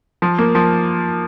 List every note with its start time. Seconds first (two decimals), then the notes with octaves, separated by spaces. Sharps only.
0.22 F3
0.38 A#3
0.55 F3